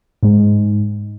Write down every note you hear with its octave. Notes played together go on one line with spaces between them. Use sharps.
G#2 G#3